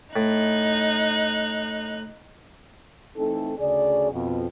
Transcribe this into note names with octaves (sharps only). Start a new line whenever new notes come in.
A2 D#4 F#6
E3 A3 C4 D#4 A4
D2 C#3 G#4 D5
F2 B2